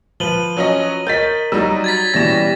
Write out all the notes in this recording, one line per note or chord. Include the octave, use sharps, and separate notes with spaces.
F3 B4 D#7 F#7 G7
F#3 C#4 D#5
A#4 C#5 D#5 G6 A6 B6
F#3 G3 D#4 D#6 E6
F#4 G#6 A6 B6
B2 E3 G3 C#4 A#6 E7